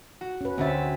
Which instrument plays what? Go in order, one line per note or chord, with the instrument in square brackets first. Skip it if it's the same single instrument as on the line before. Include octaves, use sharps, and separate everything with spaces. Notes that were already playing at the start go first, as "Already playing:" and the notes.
[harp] F#4
[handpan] C#4 B4
[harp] D2 A6 [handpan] C4 C#4 E5